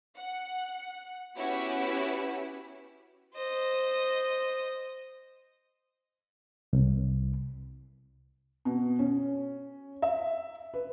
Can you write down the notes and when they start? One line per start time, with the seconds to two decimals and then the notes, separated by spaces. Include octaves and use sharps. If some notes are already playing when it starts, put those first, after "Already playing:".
0.18 F#5
1.37 B3 C#4 E4 F#4 G4 B4
3.35 C5 D#5
6.73 C2
8.65 B2
8.99 C#4
10.02 E5
10.74 B4